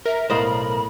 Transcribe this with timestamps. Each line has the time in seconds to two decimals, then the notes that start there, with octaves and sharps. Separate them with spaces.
0.06 A#4 E5
0.30 B1 A2 B3 C5 D#5 F5 B5